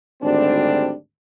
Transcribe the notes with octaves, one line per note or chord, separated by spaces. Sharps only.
G#1 D2 G3 C4 D4